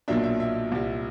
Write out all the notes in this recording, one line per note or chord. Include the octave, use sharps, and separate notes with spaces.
B1 A#2 F#3 A#3 D4 E5
E5
E5
C2 A#2 G3